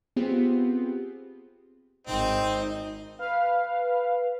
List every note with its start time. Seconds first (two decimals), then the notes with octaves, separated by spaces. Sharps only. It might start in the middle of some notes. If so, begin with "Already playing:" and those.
0.16 B3 C4 F4 G4 G#4 C5
2.07 G#1 C4 D#4
3.19 B4 F5